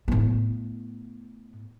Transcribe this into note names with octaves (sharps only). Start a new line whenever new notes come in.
A2 B3